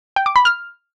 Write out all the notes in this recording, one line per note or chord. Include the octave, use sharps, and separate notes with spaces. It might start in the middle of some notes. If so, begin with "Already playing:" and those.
G5
D6
B5
F6